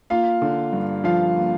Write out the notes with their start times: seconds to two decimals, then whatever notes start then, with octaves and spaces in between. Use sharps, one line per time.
0.10 A#3 F4 F5
0.42 D3
0.73 G2
1.04 F3 F4 F5
1.36 A#3